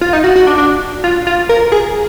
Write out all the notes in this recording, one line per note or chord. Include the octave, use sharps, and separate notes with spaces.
F4
D#4
F#4
F#4
D4
D4
F4
F4
A#4
G#4